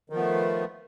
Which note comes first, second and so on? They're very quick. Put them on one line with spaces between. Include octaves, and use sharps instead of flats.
D#3 F3 B3 A3